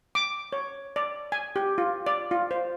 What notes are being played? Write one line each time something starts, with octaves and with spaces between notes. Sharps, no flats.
D6
C#5
D5
G#5
G4
F4
D5
F4
C5